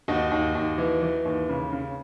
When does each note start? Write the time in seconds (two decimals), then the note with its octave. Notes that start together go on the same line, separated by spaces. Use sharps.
0.08 D#2 D#4 F#4
0.32 D#2
0.55 D#2
0.78 E3
1.03 E3
1.25 D#2
1.49 C#3
1.73 C#3